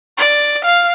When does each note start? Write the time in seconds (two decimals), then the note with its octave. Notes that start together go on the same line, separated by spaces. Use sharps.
0.17 D5
0.64 F5